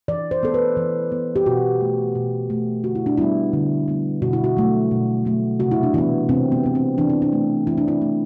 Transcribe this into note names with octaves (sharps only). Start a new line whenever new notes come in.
E3 D5
C5
B3 A4
B4
E3
B3
G4
B2 F#4
A3
B2
A3
D3 F#4
E4
D4
G3 B3 E4
D3
G3 B3
B2 F#4
E4
F#4
F#3 A3
B2
F#3 A3
C3 F#4
E4
D4
E3 B3 E4
C3 C4
B3
E3 B3
C4
E3 D4
C4
D4
A3
E3 E4
D4
E4
A3